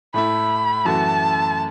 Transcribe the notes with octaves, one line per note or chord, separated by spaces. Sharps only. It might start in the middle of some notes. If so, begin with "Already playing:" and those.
A2 A3 E4 B5
F#2 E3 A3 F#4 A5